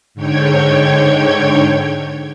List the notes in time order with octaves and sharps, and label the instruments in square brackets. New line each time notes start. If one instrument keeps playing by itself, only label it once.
[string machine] G#2 D3 C#5 G5 G#6